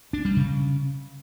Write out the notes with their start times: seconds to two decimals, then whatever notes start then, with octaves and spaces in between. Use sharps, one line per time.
0.13 D4
0.25 G3
0.36 C#3